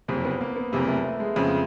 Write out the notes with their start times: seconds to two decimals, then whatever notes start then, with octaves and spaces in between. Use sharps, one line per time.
0.08 F#1 F2 C3 C4
0.25 B3
0.41 A#3
0.56 B3
0.72 F#1 F2 C3 A#3
0.88 A3
1.04 A3
1.20 G#3
1.36 F2 C#3 F3